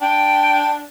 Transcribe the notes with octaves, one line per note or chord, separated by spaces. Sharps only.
D4 G5